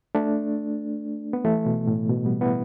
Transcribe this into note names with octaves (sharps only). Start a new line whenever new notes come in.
A3 D4
B3
E3 A3
B2
A2
B2
G3 B3
B3 E4